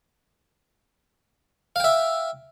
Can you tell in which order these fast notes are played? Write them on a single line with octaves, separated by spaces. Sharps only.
F5 G5 E5